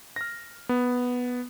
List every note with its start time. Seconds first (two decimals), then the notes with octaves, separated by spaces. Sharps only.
0.16 F6 A#6
0.69 B3